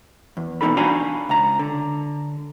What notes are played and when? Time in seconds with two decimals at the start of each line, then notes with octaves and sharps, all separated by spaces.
0.37 E2
0.61 E2 B2 F#3 D#4 A4 B5
0.77 D4 F#4 F5 G#5 A#5 B5
1.29 C#2 A#5
1.59 D3